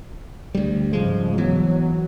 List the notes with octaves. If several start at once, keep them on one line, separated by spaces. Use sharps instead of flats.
D2 G3
G#2 C#3 F3 G3 G#3
E3 F#3 B3